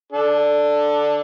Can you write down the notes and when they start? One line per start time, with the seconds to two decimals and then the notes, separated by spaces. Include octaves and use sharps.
0.12 D4 A4